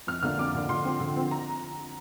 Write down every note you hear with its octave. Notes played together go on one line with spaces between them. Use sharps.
F2 F6
D3 A#3 D4 F6
F2 D6
D3 A#3 D4
D3 C6
F3 C4
D3
F3 C4
A#5